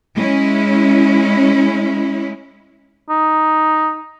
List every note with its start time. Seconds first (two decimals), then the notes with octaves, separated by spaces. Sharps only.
0.15 G#3 C#4 E4
3.09 D#4